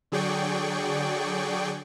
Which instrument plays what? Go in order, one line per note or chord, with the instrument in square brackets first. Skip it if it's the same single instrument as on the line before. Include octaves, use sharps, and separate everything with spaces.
[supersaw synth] D3 F#3 G#4 D5 G5 C#6